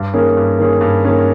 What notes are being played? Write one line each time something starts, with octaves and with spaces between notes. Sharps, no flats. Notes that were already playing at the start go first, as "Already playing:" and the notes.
Already playing: G2
D#3 A#3 C#4 G#4
G2
D#3 A#3 C#4 G#4
G2
D#3 A#3 C#4 G#4